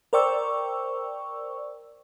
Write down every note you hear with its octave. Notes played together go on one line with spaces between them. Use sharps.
A#4 C5 D5 G5 C#6 E6